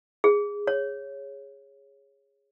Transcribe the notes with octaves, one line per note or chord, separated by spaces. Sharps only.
G#4
C#5